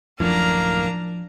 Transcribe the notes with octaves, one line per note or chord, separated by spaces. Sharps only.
D1 F#2 A2 F3 A#3 D4 A#5 F6